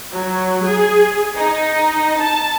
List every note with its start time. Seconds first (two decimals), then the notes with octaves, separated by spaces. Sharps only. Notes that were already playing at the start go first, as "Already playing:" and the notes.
0.12 F#3
0.64 G#4
1.36 D#4
2.19 A5